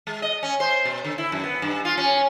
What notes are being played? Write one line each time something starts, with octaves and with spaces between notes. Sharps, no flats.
G#3
D#5
C#4
C5
B2
D3
E4
F#2
B3
G2
F4
C#4